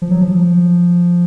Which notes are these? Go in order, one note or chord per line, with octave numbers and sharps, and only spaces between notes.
F3
F#3
F3